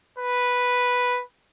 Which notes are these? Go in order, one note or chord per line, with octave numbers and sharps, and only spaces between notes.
B4